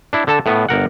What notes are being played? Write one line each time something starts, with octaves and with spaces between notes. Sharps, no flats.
D4 E4
D3 A4 A5
A2 B3
G1 A#4 F#5